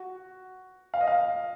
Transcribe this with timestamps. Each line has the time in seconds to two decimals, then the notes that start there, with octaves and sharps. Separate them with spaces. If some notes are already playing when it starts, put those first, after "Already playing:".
Already playing: F#4
0.94 F5
1.01 D#5
1.08 F5